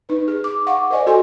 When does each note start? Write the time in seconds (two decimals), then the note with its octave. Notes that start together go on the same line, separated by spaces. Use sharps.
0.09 D#4 B4
0.28 G#4
0.44 D6
0.67 F5 F#5 C#6 D6
0.90 A#4 C5 D5 D#5 G#5
1.07 F#4 A4 G#5 C6